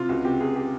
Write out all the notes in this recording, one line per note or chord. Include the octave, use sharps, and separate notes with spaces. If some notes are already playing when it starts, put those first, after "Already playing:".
Already playing: C3 F4
C#2 F#4
C3 G4
C#2 G#4
G4